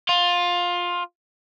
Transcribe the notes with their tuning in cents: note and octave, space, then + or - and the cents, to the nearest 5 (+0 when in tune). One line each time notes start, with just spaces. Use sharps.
F4 +15